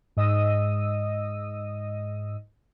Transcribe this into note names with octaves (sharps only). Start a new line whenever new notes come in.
G#2 D#5 D#6 E6 D#7